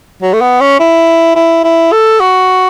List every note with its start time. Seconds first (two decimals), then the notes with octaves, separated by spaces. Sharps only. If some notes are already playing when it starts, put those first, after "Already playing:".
0.22 F#3
0.33 A3
0.41 B3
0.61 C#4
0.79 E4
1.35 E4
1.64 E4
1.92 A4
2.20 F#4